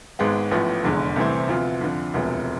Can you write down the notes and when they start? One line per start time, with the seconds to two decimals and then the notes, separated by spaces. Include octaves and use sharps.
0.19 G#1 G#2 G#3 B3
0.51 A1 A2 F3 B3
0.83 F1 E2 D3 G#3
1.16 C2 C3 E3 A3 C4
1.48 D2 C3 F3 B3 F4
1.81 F2 D3 F3
2.14 E1 D2 C3 F3 B3